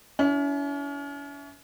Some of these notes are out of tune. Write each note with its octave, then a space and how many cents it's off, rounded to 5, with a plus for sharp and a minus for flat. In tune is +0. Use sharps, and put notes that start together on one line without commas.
C#4 +40 E4 +0